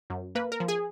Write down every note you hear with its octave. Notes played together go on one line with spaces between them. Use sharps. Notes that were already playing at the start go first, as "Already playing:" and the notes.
F#2
A#3 B4
A#4
F3
G#4